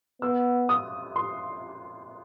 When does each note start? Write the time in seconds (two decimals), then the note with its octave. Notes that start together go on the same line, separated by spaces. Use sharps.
0.22 B3 E6
0.69 D#6
1.16 C6